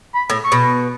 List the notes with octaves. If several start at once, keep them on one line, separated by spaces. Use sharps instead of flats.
B5
A2
C#6
B2